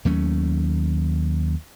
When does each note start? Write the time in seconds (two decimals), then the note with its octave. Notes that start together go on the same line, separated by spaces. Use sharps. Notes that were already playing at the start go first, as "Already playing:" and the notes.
0.05 D#2 F#3 A3 C#4